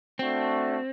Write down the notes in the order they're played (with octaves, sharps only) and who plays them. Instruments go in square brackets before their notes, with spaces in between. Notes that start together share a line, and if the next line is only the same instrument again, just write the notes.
[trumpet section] A3 D4 F#4 [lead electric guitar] C4